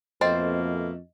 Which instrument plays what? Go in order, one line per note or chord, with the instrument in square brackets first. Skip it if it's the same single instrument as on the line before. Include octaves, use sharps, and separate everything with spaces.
[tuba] F2 [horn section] B2 A3 A#3 [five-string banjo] C4 C5 [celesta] D#5 A6